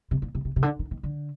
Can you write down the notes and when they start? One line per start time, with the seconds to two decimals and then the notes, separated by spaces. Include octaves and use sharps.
0.11 C3
0.22 A#2
0.35 C3
0.45 C3
0.56 C3
0.62 D3
0.79 D#3
0.91 D#3
1.03 D3